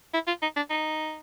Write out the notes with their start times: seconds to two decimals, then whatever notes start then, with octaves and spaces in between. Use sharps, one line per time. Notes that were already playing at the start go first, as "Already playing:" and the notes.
0.13 E4
0.27 F4
0.42 D#4
0.56 D4
0.70 D#4